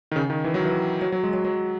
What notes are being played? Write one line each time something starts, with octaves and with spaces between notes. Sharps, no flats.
D#3
C#3
D#3
E3
F#3
E3
F#3
F#3
G#3
F#3
F#3